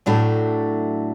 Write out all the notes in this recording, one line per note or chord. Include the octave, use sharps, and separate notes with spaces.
A2 F#3 A3 D4 F#4